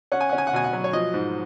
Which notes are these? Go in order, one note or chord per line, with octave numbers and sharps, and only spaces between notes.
C#4 F#5
G#5
C#4 F#5
G#5
F#5
B2 G#5
F#5
F#3
C#5
F3 D#5
G#2